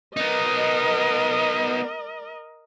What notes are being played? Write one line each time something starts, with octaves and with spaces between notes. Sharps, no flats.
B3 D#4 A#4 D#5